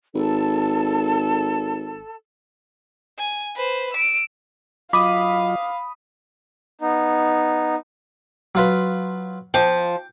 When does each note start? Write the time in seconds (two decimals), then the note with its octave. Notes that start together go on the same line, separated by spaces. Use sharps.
0.15 G#1 A4
3.18 G#5
3.56 B4 C5
3.93 E6 D7
4.93 F#3 F4 D#5 F5 B5 D6 D#6
6.81 B3 D#4
8.55 F#3 F4 B4
9.54 F3 G5 D6